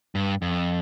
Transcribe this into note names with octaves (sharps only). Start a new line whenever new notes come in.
G2
F2